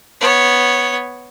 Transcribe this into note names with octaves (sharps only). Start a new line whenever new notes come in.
B3 C#5